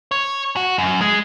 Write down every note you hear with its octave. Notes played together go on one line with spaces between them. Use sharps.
C#5
F#4
F#2
G#3